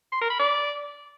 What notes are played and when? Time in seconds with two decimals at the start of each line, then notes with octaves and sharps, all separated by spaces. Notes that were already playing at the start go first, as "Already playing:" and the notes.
0.12 C6
0.21 A#4
0.30 B5
0.39 D5